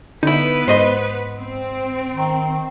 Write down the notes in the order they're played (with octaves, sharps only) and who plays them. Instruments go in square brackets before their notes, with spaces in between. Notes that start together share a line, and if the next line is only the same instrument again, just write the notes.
[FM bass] D3 [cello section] B3 B4 [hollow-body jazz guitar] D#4 E4
[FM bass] G#2 [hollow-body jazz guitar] C5 D#5 C6
[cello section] C4
[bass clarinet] D#3